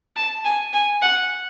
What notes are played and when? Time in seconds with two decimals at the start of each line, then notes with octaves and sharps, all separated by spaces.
0.16 A5
0.45 G#5
0.73 G#5
1.02 F#5